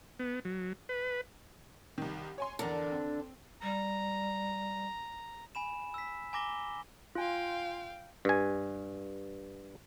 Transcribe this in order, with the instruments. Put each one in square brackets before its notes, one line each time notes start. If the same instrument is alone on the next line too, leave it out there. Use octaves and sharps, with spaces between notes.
[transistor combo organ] B3
F#3
B4
[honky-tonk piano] C2 D#3
C#5 G#5 C6
[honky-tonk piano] E2 A#4 A5 [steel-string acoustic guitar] D3 D4
[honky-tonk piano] C4
[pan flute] G3 [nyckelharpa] A#5
[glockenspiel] G#5 B5 E7
E6 B6
G#5 A#5 D6 A#6 G7
[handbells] F4 G#5 [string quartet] F5 G5
[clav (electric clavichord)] G2 G#5